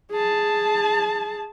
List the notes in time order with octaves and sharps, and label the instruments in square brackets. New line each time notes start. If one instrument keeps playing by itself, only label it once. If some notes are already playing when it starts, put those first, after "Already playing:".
[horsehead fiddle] G#4 A5